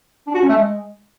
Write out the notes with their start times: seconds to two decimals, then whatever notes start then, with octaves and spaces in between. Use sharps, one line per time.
0.27 D4
0.34 F#4
0.42 C#4
0.49 A3
0.57 G#3